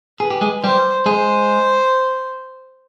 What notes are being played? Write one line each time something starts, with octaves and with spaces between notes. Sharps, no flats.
G#4 B4
G4
G#3 G#4
G3 G4 C5
G#3 G#4 C5